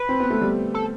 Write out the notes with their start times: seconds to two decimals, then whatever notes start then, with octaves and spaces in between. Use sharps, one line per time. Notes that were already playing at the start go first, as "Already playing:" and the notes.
Already playing: B4
0.09 C4
0.20 B3
0.30 A3
0.41 G3
0.74 A4